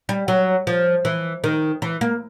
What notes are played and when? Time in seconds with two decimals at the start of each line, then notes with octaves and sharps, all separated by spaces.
0.09 G3
0.28 F#3
0.67 F3
1.05 E3
1.44 D#3
1.82 E3
2.01 A#3